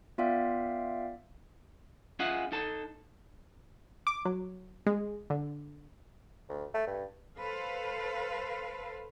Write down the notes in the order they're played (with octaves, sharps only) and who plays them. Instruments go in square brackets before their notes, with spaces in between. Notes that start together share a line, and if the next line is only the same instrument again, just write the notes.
[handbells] B3 F4 D5 E5 F5 G5
[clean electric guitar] C#4 F4 G#4 D#5 E5 F#5
D#4 A4 A5
[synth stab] D6
F#3
G#3
D3
[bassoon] D2
A3
G2
[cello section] A4 B4 C5 F5